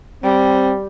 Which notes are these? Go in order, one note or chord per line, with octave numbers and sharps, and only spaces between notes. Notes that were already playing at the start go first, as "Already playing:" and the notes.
G3 C4